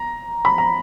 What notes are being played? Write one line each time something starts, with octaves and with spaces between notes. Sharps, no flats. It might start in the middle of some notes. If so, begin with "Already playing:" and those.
Already playing: A#5
B5
A#5